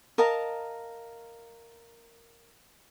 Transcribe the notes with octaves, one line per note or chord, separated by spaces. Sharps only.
A#4 D#5 F5 A5